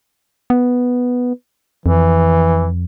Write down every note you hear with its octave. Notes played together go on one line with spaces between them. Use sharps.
B3
F2 E3